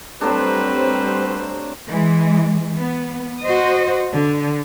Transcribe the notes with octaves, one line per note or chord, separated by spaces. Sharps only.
F#3 G3 A3 C4 D4 B4 C5
E3 G#3
B3
F#4 C5 D#5
D3